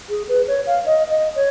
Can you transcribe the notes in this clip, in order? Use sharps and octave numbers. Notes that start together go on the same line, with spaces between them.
G#4
B4
C#5
F5
D#5
D#5
C#5